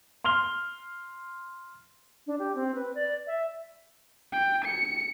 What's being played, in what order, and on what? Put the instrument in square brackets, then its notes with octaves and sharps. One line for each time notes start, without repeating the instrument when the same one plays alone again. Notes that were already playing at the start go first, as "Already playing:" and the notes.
[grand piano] C6 F6 F7 G7
[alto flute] D4
G4
C4
B4
D5
E5
[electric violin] G5
C#7